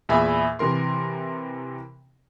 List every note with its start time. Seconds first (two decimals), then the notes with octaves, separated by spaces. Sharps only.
0.09 E2 A#2 G#4 E5 G#5 B5
0.59 C3 E3 A#4 C6